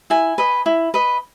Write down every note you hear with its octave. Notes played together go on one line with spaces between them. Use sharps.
E4 G#5
B4 D#5
E4
B4 D#5